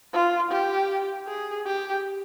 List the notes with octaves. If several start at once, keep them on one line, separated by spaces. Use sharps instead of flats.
F4
G4
G#4
G4